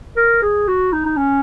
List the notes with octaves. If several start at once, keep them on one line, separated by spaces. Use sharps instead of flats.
A#4
G#4
F#4
D#4
D#4
C#4